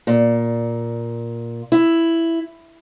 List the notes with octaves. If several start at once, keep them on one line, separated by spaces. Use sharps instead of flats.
A#2
E4